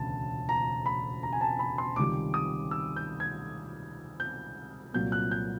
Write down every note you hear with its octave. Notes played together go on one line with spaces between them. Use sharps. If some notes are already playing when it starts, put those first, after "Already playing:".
Already playing: E1 D2 C#3 A5
A#5
B5
A#5
G#5
A5
B5
C6
C#2 C3 D#3 G3 D6
D#6
E6
G6
G#6
G6
C2 A#2 F#3 A#3 G6
F#6
G6